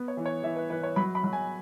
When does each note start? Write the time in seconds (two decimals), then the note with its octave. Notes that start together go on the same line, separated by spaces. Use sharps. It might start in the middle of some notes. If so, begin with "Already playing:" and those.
Already playing: B3
0.08 C#5
0.17 E3
0.25 C#5
0.43 E3 E5
0.56 B4
0.70 E3 B4
0.83 C#5
0.96 F#3 B5
1.15 B5
1.24 F#3
1.33 G#5